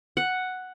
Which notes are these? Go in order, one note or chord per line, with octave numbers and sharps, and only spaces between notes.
F#5